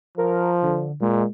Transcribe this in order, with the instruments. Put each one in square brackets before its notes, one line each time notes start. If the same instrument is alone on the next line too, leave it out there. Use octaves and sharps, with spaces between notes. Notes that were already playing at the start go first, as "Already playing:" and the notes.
[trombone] F3 [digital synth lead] A#4
[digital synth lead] D3
[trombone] A#2 [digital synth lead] G#3